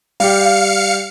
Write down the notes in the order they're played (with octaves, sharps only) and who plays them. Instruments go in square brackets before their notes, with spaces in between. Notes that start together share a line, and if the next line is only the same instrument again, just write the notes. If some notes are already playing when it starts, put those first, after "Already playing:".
[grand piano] G3 G4 [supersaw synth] F5 C#7